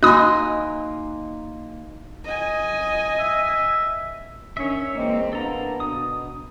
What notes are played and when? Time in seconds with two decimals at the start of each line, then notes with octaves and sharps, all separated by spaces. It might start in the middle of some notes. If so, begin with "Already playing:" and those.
0.03 A#3 D#4 F#4 D#5 G#5 C6 D#6 F#6
2.24 D#5 G#5
3.19 E5
4.57 D#3 C#4 D4 C#5 E5
4.95 E3 G#3 A#3 C4 D#5
5.33 E2 A#3 B3 D4 A4 A#5
5.80 B2 D#6